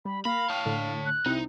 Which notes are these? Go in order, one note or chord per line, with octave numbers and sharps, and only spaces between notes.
G3 B5
A#3 F5 B5 A#6
C#5 G5 A5 D#6
A2 D3
F#6
C2 C4 D#4 E4